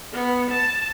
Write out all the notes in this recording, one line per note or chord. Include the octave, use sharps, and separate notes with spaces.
B3
A5